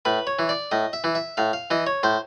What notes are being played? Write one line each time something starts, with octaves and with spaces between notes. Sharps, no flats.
A2 B4
C#5
E3
D5
A2 D#5
E5
E3
E5
A2 F5
F5
E3 D#5
C#5
A2 C5